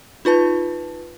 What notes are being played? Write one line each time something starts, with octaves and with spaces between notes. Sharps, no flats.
D#4 F4 B4 A5